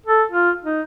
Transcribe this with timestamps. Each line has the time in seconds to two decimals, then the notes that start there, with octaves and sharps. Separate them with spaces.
0.06 A4
0.31 F4
0.63 D#4